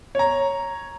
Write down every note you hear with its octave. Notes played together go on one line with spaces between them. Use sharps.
C#5 A#5